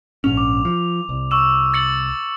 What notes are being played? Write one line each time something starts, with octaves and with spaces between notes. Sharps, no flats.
A#1 G#2 C#4 F7
D6
F3
C2
C#6 E6 E7
A6 C#7 F#7